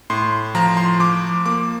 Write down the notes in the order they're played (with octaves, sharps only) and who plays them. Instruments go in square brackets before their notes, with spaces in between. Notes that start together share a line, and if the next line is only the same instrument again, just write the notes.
[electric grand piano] A2 C6
F3 A#5
C6
F3 D6
A#3 D6